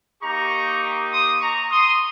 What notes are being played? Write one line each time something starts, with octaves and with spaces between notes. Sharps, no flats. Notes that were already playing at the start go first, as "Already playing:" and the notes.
A#3 D#4 G4 A#5 C#6
C6 D#6
A#5 C#6
C6 D#6